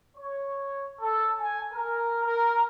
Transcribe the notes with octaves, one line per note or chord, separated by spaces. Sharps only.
C#5
A4
G#5
A#4
A#4